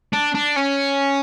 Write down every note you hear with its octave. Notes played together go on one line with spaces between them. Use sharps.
D4
D4
C#4